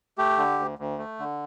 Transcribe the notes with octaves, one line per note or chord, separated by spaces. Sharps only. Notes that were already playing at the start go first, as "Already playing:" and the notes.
A3 G4
D3
D2
D2
A3
D3